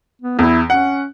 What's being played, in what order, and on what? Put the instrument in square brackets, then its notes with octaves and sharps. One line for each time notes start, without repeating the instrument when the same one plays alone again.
[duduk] B3
[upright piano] E2 [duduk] E4
[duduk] C#4 [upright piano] F#5